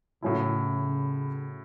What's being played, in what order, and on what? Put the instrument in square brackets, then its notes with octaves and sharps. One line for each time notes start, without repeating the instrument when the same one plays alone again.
[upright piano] A2 F#3 C#4 E4 [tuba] C#3